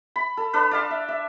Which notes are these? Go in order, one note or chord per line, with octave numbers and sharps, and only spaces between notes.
B5
A4
D4 A4 B4
D5 F5 A5 C6
E5
E5